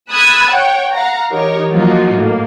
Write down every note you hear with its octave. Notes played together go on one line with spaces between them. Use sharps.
B5 D#6 E6 F#6 G#6 A6
C#5 F#5 G5
F5 F#5 A#5
E3 D#4 G4 A#4 C#5
F3 F#3 A#3 D#4 F4 F#4
A2 A#3